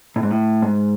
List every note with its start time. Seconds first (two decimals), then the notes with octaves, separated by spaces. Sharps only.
0.16 A2
0.23 G#2
0.31 A2
0.62 G#2